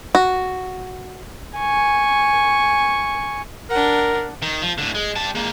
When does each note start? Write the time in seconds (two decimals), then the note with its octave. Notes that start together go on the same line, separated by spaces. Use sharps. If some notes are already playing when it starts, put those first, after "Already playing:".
0.15 F#4
1.58 G#5 C#6
3.70 D4 A#4 F#5
4.42 D#3
4.62 F3
4.78 A2 D3
4.95 G#3
5.16 G3 A5
5.35 G#3 A#3